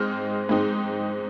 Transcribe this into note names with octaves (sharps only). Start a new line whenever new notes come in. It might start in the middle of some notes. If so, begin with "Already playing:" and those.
Already playing: G#2 G#3 C4 D#4 F6
G#2 G#3 C4 D#4